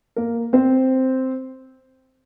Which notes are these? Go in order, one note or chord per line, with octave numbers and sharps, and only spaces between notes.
A#3 A#4
C4 C5